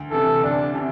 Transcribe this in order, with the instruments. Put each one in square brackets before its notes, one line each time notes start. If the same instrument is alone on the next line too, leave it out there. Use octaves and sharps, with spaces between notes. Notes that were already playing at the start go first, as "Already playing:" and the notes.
Already playing: [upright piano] D2
[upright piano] C3 E3 [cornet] A4
[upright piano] D2 [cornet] D4
[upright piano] C3 E3